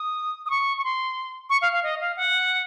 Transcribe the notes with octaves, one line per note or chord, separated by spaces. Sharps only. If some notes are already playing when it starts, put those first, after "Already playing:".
Already playing: D#6
D#6
C#6
C#6
C6
C#6
F5
F5
D#5
F5
F#5